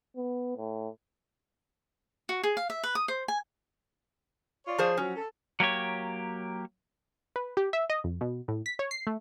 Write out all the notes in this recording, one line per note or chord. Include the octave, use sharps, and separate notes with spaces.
B3
A2
F#4
G#4
F5
E5
B4
D#6
C5
G#5
F4 C#5 D5
F3 G#4 C5
F3 F#3 C#4
A4
F#3 A#3 G4 C#5
B4
G4
E5
D#5
F2
B2
A2
B6
C#5
C7
A3